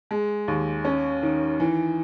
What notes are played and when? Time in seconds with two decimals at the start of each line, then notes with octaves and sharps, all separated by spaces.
0.11 G#3
0.48 D#2
0.85 C#4
1.23 D#3
1.60 E3